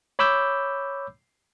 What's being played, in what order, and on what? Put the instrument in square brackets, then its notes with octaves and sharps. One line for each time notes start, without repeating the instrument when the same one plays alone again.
[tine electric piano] C#5 B5 D6 E6 G6